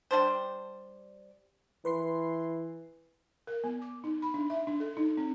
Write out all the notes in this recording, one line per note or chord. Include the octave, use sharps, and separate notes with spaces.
G3 D4 C5
E3 B4 C6 C7
A#4
B3
D6
D#4
B5
D4
E5
D4
A4
D#4
C4